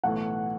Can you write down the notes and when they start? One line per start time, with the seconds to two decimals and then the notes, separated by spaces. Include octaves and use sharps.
0.04 B1 A2 E3 A3 F#5